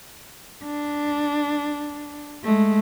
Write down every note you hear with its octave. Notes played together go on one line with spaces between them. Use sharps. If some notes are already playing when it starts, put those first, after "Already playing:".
D4
G#3 A3